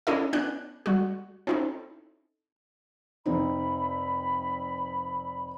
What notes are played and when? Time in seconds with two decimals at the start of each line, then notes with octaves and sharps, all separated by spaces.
0.07 C#4 D4 E4 A4 D#5
0.33 B3 C#4 D4 F#6
0.86 G3 F#4
1.47 C4 C#4 D#4 E4 A4
3.26 F1 C4 D#4 B5